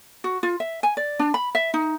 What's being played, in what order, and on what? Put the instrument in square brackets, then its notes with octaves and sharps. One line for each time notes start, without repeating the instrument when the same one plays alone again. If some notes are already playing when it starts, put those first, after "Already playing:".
[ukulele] F#4
F4
E5
G#5
D5
D4
B5
E5
D#4